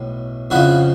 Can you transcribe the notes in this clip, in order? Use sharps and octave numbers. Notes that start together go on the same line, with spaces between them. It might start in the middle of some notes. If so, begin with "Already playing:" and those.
Already playing: B1 A2
F2 C#3 F3 E4 F#4